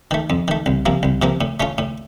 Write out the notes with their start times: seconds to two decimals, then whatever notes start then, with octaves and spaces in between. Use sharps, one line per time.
0.11 D#3 A3
0.30 F2
0.48 D#3 A3
0.66 C2
0.86 C3 F3 A#3
1.03 C2
1.22 C3 F3 A#3
1.41 A2
1.60 A3 C#4 F4
1.78 A2